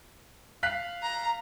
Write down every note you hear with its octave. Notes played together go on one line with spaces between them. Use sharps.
F5 F#6 B6
A#5